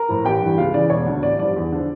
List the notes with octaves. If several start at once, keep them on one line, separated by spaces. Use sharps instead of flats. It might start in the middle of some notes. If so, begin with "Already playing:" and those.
Already playing: A#4 A#5
A2 F3
A1 G4 G5
G2 E3
C#2 F4 F5
C#3 E3 D5
E1 C#5
D2 D3
A1 D5
G2 F3 D5
E2
D3 F3